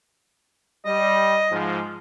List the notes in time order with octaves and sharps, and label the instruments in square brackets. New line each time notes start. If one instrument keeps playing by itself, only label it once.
[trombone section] G3 [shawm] D#5
[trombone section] G#2 F3